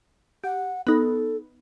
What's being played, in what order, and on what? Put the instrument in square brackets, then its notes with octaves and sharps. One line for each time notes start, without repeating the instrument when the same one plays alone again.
[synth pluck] G4 [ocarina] F#5
[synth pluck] B3 D#4 [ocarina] A4